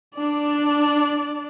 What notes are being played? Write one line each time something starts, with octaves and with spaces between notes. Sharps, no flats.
D4 D5